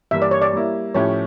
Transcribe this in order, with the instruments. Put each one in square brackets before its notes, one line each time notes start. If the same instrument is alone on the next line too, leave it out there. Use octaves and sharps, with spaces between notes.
[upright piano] G2 E3 G3 A#3 [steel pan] E5
[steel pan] D5
C#5
D5
[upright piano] G3 A#3 E4
[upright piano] A2 F3 A3 C#4 G4 [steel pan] C#5